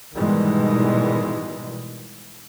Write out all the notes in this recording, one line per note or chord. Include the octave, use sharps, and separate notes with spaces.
G#2 B2 D#3 E3 G3 G#3